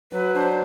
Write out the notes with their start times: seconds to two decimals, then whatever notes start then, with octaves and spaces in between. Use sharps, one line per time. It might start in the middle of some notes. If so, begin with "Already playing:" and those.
0.12 F#3 B4
0.34 D4 C5